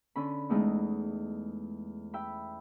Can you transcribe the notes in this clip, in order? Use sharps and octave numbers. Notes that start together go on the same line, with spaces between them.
D3 C#4 B5
E2 G#3 A3 D#4
E5 G5 B5